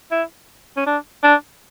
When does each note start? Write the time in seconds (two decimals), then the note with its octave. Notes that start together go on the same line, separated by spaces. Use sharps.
0.11 E4
0.77 C#4
0.86 D4
1.23 D4